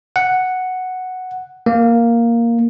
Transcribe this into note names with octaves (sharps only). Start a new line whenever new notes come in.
F#5
A#3